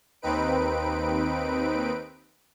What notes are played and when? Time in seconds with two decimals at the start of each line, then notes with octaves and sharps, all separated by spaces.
0.22 D#2 C4 D#4 B4 D7